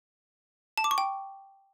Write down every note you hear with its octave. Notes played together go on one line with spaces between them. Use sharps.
A5
D6
C#6
G5